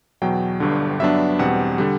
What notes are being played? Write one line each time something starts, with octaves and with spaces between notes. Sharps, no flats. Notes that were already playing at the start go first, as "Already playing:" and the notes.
E2 B2 F#3 G5
G1 G2 D3
G2 F#3 B3 D4 E5
E2 B2 G3 C4 F#5
D3 G3